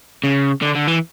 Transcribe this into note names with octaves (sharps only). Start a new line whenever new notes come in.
C#3
D3
D3
E3